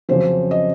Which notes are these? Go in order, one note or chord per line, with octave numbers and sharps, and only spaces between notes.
F2 C#3 F#3 C5
D#5